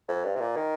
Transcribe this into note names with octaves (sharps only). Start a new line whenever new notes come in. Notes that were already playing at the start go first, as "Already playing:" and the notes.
F2
G2
C3
A#2
D#3